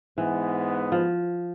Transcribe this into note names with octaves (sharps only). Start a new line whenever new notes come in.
G#2 E3 B3
F3